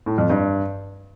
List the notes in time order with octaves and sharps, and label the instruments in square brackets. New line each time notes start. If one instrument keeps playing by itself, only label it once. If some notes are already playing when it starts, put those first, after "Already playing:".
[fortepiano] A2
F2
G2